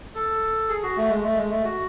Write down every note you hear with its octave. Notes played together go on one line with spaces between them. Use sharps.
A4
G#4
F#4
A3
G#3
A3
G#3
A3
F#4